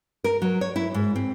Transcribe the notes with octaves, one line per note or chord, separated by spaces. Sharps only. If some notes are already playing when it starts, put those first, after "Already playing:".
A#4
F#3
C#5
E4
G#2
C4